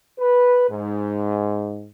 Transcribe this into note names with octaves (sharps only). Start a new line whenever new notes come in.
B4
G#2